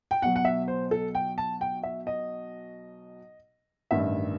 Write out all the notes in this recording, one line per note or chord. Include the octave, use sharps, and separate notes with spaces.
G5
B1 B2 F#3 F#5
F#5
E5
C5
A4
G5
A5
G5
E5
D#5
A1 G2 D#3 E5